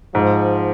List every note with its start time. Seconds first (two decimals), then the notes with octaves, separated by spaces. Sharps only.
0.14 G#2 F3